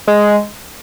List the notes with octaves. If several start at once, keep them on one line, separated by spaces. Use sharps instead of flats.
G#3